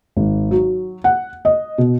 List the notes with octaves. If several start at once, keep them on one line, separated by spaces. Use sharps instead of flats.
G#1
F#3
F#5
D#5
B2